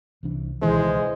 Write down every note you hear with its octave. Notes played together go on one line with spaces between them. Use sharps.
C2 E3 D4
C#2 B2 D#3 E3 G#3 E4 C5